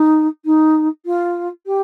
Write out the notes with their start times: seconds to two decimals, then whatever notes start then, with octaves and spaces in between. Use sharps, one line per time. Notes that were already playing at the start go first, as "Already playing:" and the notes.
Already playing: D#4
0.45 D#4
1.06 F4
1.66 G4